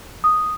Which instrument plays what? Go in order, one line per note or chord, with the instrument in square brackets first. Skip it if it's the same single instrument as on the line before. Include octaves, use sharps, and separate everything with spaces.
[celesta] D#6